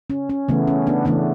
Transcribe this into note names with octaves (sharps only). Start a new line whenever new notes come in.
C#4
C#4
C#3 E3 A3 B3
C#4
B3 D4
C#3 E3 A3 B3 D4